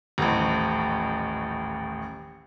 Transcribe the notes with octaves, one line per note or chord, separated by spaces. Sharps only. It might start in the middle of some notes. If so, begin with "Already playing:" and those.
D#1 A1